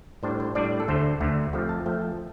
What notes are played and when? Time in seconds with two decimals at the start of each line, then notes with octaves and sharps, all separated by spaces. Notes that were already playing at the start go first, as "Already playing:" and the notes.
0.23 A2 G3 D4 C5
0.40 C5
0.55 A2 G3 D4 D5
0.80 A4
0.88 D2 D3 A3 C5
1.20 D2 D3 A3
1.53 F2 F3 A3 C4 G4
1.69 A5
1.85 F2 F3 A3 C4 G5
2.02 A5